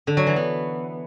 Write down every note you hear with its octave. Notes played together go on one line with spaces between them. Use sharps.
D3
F#3
E3
B3